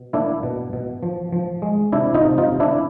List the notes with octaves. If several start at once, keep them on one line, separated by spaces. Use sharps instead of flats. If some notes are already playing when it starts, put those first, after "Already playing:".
Already playing: B2
A#3 D4 E4
B2
B2
F3
F3
G#3
C3 D4 E4
D#4 F4
C3
D#4 F4
C3
D4 E4